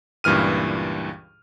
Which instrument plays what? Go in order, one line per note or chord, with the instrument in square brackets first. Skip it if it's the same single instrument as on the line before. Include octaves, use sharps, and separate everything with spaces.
[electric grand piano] C#2 G2 A#2 E3 F6 D#7